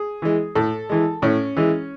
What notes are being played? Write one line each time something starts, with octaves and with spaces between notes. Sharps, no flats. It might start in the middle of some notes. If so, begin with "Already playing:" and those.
Already playing: G#4
E3 G#3
A2 A4
E3 G#3
A2 C#4
E3 G#3